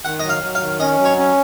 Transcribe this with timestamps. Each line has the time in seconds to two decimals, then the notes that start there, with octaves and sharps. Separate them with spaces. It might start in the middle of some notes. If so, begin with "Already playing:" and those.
0.05 D#3 F#5
0.19 F#3 D#5
0.29 F5
0.42 F#3
0.55 F5
0.60 D#3
0.80 C#4 D#5
0.99 F#3
1.05 C#5
1.17 C#4